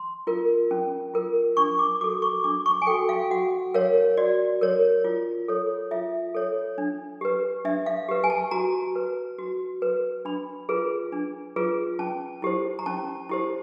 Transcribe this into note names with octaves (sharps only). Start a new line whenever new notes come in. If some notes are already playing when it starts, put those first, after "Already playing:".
Already playing: C6
F4 A#4
C#4
F4 A#4
D4 C#6
D6
F#4 A4 D6
C#6
D4 D6
C#6
G#5
F#4 A4 G5
F5
F#4 F#5
A#4 C#5 F5
F#4 D5
A#4 C#5
F4
A4 C#5
F4 E5
A4 C#5
D4
G4 B4
D4 E5
F5
G4 B4
G#5
A5
F#4 A#5
B4
F#4
B4
D4 B5
F4 G#4 B4
D4
F4 G#4 B4
C#4 A5
E4 G4 C5
A#5
C#4 A5
E4 G4 C5